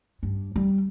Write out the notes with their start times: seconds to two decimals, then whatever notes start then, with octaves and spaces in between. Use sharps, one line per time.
0.23 G2
0.56 G3